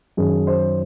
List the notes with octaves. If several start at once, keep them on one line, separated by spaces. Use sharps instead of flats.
F#2 D#3 G#4
C5